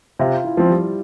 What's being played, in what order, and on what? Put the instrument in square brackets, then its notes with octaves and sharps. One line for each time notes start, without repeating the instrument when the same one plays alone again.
[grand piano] C3 [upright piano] F4
[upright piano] E4
[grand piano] F3 C4
[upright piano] G3